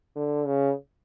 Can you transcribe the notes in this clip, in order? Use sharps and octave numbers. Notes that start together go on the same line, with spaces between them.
D3
C#3